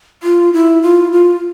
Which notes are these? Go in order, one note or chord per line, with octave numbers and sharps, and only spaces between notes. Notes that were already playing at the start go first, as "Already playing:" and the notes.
F4
E4
F4
F4